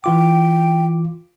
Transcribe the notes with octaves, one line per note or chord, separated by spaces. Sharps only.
E3 F4 G5 D6